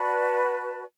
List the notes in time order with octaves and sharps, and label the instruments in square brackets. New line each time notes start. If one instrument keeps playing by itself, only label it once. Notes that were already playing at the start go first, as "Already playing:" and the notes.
Already playing: [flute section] F#4 B4 D5 A5